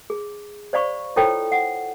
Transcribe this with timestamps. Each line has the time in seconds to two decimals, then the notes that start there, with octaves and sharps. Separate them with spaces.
0.10 G#4
0.73 C5 D5 F5 B5 C#6
1.16 E4 F4 A4 C5 C#5 G5
1.52 F#5